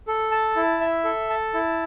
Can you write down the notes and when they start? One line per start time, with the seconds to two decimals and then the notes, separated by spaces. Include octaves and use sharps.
0.08 A4
0.32 A5
0.56 E4
0.81 E5
1.05 A4
1.30 A5
1.54 E4